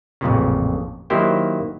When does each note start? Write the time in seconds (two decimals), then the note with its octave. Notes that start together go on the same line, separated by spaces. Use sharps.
0.21 A1 F2 A#2 C#3
1.10 D#3 F#3 A#3 E4 G4 C5